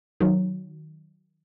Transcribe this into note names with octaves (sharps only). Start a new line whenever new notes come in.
D#3 F#3